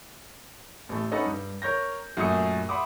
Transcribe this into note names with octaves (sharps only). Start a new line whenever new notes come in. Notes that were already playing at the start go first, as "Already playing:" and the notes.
A1 A3
C#4 D#4 A4 B4 D#5 F#5
G2
A#4 C#5 G6 A#6
F#2 A#2 A3 G#4 D#6 C#7
E5 F#5 B5 C6 D6 D#6